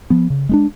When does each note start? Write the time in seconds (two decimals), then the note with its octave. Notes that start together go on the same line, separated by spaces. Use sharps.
0.10 F3 B3
0.30 C#3
0.49 G#3 B3 D4